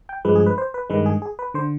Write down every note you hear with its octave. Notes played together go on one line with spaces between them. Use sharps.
G5
G2 F3 G#3 B4
G#4
B4
C5
B4
G2 D#3 G#3 B4
G#4
G#4
B4
D3 C5